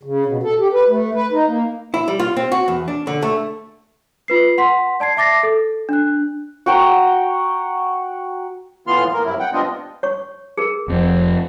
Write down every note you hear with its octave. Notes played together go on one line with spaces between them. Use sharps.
C#3
B2
A4
G4
B4
A3
B4
D#4
A#3
E4
G3
F4
C4
F#4
E2
D4
D3
A3
F4 B4 C7
F#5 C6 B6
D5 A5 G#6 C7
E5 A5 D6 A6 A#6 C7
A4
D4 F#6
F#4 G5 A#5
A2 E3 B3 F4 C6 F6
A#3 A#4
G2 C3 F#3 E4
F#5 G5
G3 B3 C4 D4 F4 D#5
C#5 C#6
G#4 A#4
F1 F2